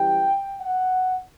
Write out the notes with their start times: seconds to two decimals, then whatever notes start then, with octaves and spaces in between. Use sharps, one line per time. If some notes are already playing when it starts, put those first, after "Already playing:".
Already playing: F#2 E3 G3 G5
0.60 F#5